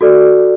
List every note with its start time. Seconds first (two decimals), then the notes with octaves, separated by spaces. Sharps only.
0.01 F#4 A4 D5